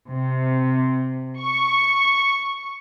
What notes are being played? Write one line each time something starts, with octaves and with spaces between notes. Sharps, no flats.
C3
C#6